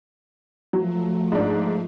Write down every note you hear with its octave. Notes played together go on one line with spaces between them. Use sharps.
F3 F#3 A3
G#2 D4